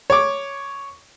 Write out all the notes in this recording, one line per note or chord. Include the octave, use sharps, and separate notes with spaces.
C#5 D6